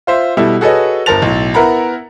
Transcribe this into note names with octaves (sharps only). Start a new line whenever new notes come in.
F4 C5 E5
B2 G3 E4 A4
F#4 G#4 A4 B4 C#5 D#5
G1 A#4 C5 A5 A6 F7
B1 A2
B3 E4 A#4 F#5 A#5 B5